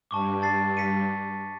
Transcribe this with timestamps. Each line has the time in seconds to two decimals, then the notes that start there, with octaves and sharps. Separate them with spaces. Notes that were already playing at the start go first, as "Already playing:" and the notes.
0.11 G2 A5 C#6 D6
0.42 A5 A6 C7
0.77 B6 C#7 D#7